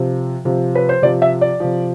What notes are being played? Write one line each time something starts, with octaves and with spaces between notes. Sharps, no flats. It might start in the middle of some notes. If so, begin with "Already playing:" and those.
Already playing: C3 F3
C3 F3
B4
C5
C3 F3 D5
E5
D5
C3 F3